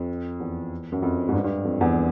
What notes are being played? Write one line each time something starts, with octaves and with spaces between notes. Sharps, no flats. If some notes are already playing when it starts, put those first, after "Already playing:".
Already playing: F2
E2
F#2
F2
G#2
G2
G2
F2
E2